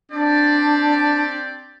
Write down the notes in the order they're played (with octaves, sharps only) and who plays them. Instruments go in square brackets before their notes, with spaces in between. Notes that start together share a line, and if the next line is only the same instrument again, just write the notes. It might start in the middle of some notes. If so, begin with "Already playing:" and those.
[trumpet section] C4 G4 D5 [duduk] D4